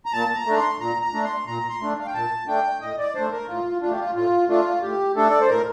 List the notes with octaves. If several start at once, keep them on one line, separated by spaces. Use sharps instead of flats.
A#5
A#2 A5
A5
A#5
A3 D4
C6
A#2 A#5
A#5
A3 D4
C6
A#2 A#5
C6
A3 D4
F5
G5
A#2 A5
A3 D4 G5
A2 D#5
D5
A3 D4 C5
A#4
A2 F4
A3 D4 F4 G4
F4
A2 F4
A3 D4 F4
A2 G4
A3 D4 A4
D5
C5
A2 A#4